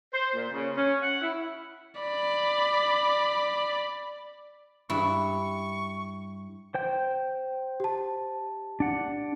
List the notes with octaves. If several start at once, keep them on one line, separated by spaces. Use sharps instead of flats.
C5
A#2
C#3
C#4
F#5
E4
D5 B5
G2 E4 C#6
C5 G5 G6
G4 A5
D4 F#5